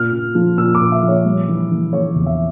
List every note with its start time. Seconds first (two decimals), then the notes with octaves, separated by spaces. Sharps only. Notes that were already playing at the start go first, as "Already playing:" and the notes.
Already playing: A#2 F6
0.12 A#2
0.35 F3
0.58 A#2 E6
0.75 D6
0.81 A#2
0.92 E5
1.02 F3
1.08 C#5
1.25 G3
1.48 E3
1.70 E3
1.93 E3 C#5
2.16 E2
2.26 E5